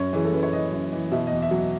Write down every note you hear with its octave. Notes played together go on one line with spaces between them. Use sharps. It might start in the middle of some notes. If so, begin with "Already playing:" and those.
Already playing: F#2 C#5
E3 G#4
A4
F#2 B4
C#5
E3 D#5
F#2
E3
B2 E5
D#5
E2
E5
F#3